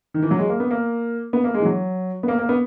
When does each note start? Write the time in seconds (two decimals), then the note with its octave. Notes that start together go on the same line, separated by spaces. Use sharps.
0.14 D#3
0.22 E3
0.31 F#3
0.39 G#3
0.49 A#3
0.60 B3
0.70 A#3
1.33 B3
1.44 A#3
1.54 G#3
1.60 E3
1.65 F#3
2.23 B3
2.28 A#3
2.39 A#3
2.49 B3